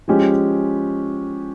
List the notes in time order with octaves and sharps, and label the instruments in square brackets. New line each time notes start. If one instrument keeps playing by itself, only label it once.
[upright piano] F3 G#3 C#4 G4